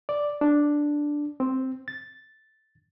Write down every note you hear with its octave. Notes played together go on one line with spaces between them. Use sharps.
D5
D4
C4
A6